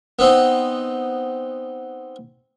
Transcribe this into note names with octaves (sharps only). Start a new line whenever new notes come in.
B3 C4 D#4